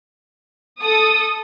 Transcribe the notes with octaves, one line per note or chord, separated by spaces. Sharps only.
A4 D#6